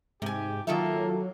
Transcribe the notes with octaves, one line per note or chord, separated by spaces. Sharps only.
G#2 C3 G4 G#5
D#3 F#3 A#3 F4 A4 E5